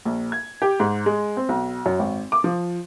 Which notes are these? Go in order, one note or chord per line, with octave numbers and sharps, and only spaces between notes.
A#1
G#6
G4
G#2
G#3
C4
B1
F#2
G#1
D6
F3